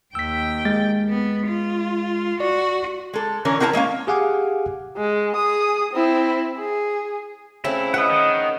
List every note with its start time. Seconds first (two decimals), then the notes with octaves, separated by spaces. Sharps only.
0.15 D#2 G5 E6 B6
0.65 G#3 A6
1.09 B3
1.47 F4
2.40 F#4 D5
3.13 G#3 A4
3.45 D3 E3 C#4 A#4
3.60 C4 E4 A#4 F#5 A5
3.73 G#3 A#3 C#4 F5
4.07 G4 G#4 F5 F#5 G#5 D6
4.97 G#3
5.36 G#4 D#6
5.93 C4 E4
6.58 G#4
7.64 C#3 A3 C4 E4
7.94 B4 D#5 F#5
8.10 D#3